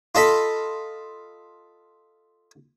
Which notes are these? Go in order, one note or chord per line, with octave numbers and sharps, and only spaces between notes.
F4 A4 D#5 B5